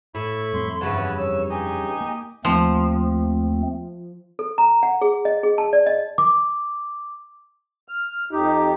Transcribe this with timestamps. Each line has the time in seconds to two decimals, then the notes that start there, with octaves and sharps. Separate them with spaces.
0.15 A2 E4 B5 C#6
0.53 F2 G3 C4 C6
0.81 G2 C#3 E3 F#4 C#5 A5 B5
1.18 C#5 E6
1.50 D#4 G4 D#5 G#5
2.01 A#3
2.45 D#2 F3 A3 C4
4.39 A4
4.58 A#5
4.83 F#5
5.02 G#4
5.25 D#5
5.43 G#4
5.58 A5
5.73 D5
5.86 D#5
6.18 D6
7.88 F6
8.32 F2 D#4 G4